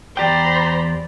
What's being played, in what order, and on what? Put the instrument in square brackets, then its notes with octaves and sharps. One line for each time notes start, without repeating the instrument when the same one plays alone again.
[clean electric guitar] E2 G4 G5 [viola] C5 [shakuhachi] D5 [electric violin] A#5 B5